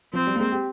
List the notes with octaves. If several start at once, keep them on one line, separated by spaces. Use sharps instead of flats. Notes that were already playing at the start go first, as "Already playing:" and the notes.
F3 C4
G3
A#3
G#3
G4